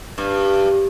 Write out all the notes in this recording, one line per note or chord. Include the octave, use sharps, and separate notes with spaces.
G2